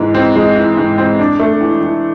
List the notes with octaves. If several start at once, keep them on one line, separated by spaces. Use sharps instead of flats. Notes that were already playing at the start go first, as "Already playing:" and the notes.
Already playing: G#2 E3 G#3
C4
G#3
E3
G#2
C4
D4
A3
E3
E3